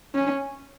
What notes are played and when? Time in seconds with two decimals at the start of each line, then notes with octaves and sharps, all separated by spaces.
0.14 C#4